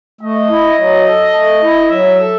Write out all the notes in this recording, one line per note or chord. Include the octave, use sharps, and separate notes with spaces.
A3 D#5
E4
F#3
A4
A3
E4
F#3 E5
A4